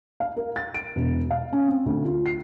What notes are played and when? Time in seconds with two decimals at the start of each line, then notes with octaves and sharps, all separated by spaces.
0.20 F5
0.37 A#4
0.56 A6
0.74 D7
0.96 E1
1.31 F5
1.53 C#4
1.68 C4
1.86 D2
2.05 F4
2.26 C7